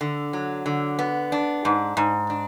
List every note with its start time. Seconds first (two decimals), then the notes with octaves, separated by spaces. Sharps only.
0.01 D3
0.33 F#3
0.66 D3
0.99 B3
1.32 D4
1.65 G#2
1.97 G#2
2.30 D4